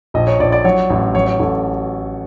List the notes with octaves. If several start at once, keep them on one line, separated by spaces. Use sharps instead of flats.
A#1 D#5
C#5
A#1 D5
D5
F#3 C#5
A1
F#3 C#5
C#5
A1 A4